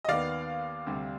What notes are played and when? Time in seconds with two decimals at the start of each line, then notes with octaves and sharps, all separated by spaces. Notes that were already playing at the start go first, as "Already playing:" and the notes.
0.04 D#5
0.08 D#2 D#3 B3 D5 F5
0.87 D2 C3 G3